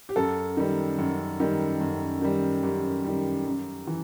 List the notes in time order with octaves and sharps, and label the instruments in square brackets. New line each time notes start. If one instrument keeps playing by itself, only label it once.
[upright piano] G4
F#2 A4
D#3 G3
F#2
D#3 G3
F#2
D#3 G3
F#2 G4
D#3 G3
F#2
E3